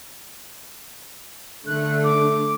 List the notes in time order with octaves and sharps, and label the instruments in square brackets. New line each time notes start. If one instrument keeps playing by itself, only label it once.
[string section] D3 A3 [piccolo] F#6
[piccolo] D6